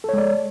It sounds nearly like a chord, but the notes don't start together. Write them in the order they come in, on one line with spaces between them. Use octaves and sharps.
A4 C#5 G#3 D5